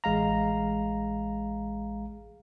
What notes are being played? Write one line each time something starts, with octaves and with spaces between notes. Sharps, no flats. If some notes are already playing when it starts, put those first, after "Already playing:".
A1 G#3 F5 A#5